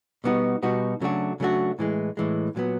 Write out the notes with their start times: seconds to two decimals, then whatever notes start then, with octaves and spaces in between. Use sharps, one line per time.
0.24 B2 G3 B3 D#4 F#4
0.63 B2 G3 B3 D#4 F#4
1.01 C#3 F#3 A3 D4 F#4
1.40 C#3 F#3 A3 D4 F#4
1.79 A2 E3 G#3
2.17 A2 E3 G#3
2.56 A#2 F#3 B3